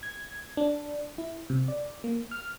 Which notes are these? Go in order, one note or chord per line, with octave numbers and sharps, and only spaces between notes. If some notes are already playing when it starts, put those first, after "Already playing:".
G#6
D4
E4
C3
D5
A#3
F6